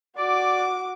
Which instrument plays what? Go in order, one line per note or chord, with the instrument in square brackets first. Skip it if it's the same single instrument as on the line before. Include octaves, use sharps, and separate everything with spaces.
[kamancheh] F#4 D6 [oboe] D5